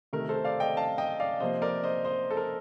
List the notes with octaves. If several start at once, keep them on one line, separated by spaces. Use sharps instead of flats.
C3 D#3 A3 A#4
A4 C5
D5 F5
D#5 G5
F5 A5
D#5 G5
D5 F5
C3 F3 A#3 C5 D#5
A#4 D5
C5 D#5
C5 D#5
A4
A#4